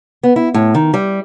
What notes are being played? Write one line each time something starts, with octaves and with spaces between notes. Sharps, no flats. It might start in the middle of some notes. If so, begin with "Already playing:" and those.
B3
E4
A2
D#3
G3